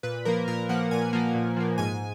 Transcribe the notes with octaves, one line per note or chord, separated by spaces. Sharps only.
A#2 B4
F3 A#3 A#4
A#2 A#4
F3 A#3 F#5
A#2 G#5
F3 A#3
A#2
F3 A#3
G#2 G#5